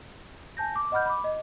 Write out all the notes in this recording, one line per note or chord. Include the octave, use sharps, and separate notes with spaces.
G#5 A5 G6 A#6
D6
D#5 F#5 B5 F6 G6
B5 D6
D#5